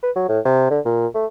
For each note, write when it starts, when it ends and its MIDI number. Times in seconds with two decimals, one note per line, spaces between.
0.03 0.11 71
0.16 0.25 54
0.28 0.39 45
0.45 0.67 48
0.70 0.79 50
0.85 1.07 46
1.15 1.25 57